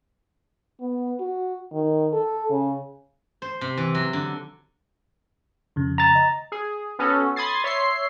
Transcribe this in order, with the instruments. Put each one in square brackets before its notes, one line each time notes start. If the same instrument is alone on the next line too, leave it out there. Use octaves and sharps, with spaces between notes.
[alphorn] B3
F#4
D#3
A4
C#3
[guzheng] C5
C3
E3
F#3
D3
[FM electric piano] F2 C#3
[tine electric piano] A#5 A6
[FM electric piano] D#5
[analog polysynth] G#4
B3 C#4 F#4 A4
B5 C6 D#6 G#6 A6 C7
C#5 E5 C6 C7